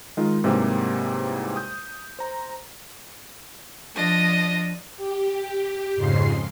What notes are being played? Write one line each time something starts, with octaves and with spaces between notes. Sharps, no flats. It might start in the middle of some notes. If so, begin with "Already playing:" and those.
D#3 G#3 D#4 F4
G#2 C3 E3 F#3 G3 A#3
D#6 G6
C5 A#5
F3 D4 D#5 A#6
G4
F2 G#2 C#3 C6 C7